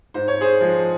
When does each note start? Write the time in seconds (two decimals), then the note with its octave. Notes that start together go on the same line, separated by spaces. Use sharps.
0.14 G#2 C5
0.28 C#5
0.41 G#4 C5
0.61 F3 G#3